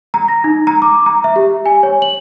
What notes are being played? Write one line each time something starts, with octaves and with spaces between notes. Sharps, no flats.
A#5
A#6
D#4
A#5
D6
A#5
E5
G4
G#5
C#5
F#7